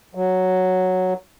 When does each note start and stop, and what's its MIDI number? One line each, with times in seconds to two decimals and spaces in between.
0.15 1.14 54